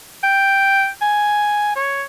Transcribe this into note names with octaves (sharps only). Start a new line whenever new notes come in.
G5
G#5
C#5